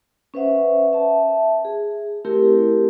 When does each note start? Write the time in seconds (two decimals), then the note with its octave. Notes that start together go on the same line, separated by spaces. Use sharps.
0.34 C#4 B4 C5 E5 F#5
0.93 E5 A5
1.65 G#4
2.25 A3 C4 E4 G4 A#4